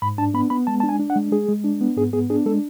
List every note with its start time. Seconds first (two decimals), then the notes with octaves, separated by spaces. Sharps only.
0.02 G#2 B5
0.18 D4 A5
0.34 B3 B5
0.50 B3 B5
0.67 G#3 A5
0.80 D4 A5
0.89 G#5
0.99 D4
1.10 F#5
1.16 G#3
1.32 G#3 G#4
1.48 G#3
1.64 D4
1.81 B3
1.97 G#2 G#4
2.13 B3 G#4
2.30 D4 G#4
2.46 G#3 A4